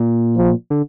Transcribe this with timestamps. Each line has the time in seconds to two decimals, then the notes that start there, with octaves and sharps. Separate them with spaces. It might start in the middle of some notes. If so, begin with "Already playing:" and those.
Already playing: A#2
0.37 F3
0.70 D3